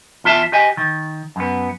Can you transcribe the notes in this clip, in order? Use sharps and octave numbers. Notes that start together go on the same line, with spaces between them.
E2 F4 E5 A5
G4 D#5 G#5
D#3
F#2 B3